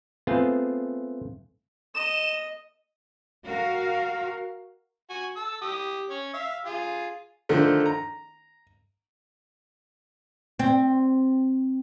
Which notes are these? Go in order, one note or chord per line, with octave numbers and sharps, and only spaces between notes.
A3 B3 C4 F4 G#4
D#5 E7
F#4 A#4 F5
F#4 G#5
A5 E6
G4 D#6
C#4 C#5
E5 F5
F4 G#4
D3 D#3 F3 A3
A#5
C4